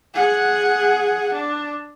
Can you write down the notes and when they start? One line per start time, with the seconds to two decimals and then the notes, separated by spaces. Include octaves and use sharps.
0.14 G#4 F#5
1.33 D4